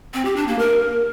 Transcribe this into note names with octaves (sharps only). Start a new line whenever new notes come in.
C4
G4
D4
A#3
A#4